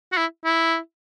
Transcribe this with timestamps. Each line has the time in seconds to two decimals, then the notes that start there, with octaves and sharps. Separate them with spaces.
0.12 F#4
0.17 E4
0.45 E4